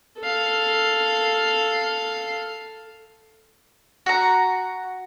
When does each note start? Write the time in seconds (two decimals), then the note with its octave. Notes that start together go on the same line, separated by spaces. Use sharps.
0.21 A4 F5
4.06 F#4 A#5